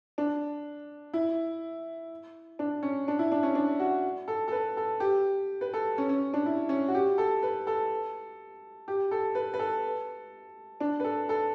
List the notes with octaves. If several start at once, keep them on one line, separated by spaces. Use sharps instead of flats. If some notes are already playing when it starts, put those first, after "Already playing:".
D4
E4
D4
C#4
D4
E4
D4
C#4
D4
F#4
A4
A4
B4
A4
G4
B4
A4
C#4
C#4
D4
E4
C#4
F#4
G4
A4
B4
A4
G4
A4
B4
B4
A4
D4
B4
A4
A4